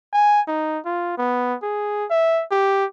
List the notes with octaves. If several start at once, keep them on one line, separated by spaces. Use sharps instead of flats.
G#5
D#4
F4
B3
G#4
E5
G4